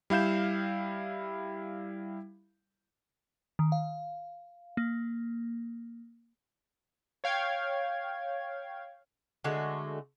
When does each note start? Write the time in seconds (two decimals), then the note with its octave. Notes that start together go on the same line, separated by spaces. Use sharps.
0.10 G3 E4 F5 G6 E7
3.59 D#3
3.72 F5
4.77 A#3
7.24 C#5 F5 G5 G#6
9.44 D3 G#3 A3 F#4